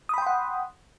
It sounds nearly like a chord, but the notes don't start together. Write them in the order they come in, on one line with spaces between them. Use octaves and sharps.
D#6 B5 G5 C6 F#5